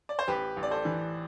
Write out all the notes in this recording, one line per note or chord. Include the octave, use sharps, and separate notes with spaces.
D5
C5
A1 G4 B4
A1
D5
A4 C5
E3